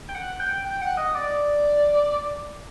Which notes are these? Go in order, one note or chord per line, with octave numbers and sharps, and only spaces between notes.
G5
F#5
G5
G5
F#5
D#5
D5